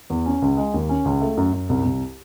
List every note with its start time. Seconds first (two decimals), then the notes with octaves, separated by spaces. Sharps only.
0.10 E2
0.26 C#4
0.42 C#2
0.57 G#3
0.74 D#2
0.89 C#4
1.05 C#2
1.21 A3
1.37 F#2
1.53 F#2
1.69 C2
1.85 C2